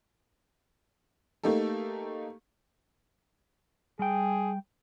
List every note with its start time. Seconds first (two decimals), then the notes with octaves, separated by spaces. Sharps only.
1.44 A3 A#3 D#4 G4 A4
3.99 G3 G#4 G5